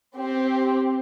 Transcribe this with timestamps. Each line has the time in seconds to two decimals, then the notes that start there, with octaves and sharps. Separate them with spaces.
0.15 C4 G4